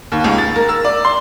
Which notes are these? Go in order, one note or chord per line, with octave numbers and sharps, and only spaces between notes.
D#2
C#2
A6
A#4
E6
D5
C6